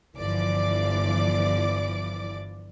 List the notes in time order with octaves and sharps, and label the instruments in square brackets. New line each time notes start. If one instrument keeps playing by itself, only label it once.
[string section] G1 E3 F3 D5 D6